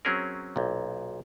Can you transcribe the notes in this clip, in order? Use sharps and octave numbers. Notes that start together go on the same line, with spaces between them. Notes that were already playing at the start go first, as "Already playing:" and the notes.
F#3 C4 C#4 G#4 A#4
B1 A#2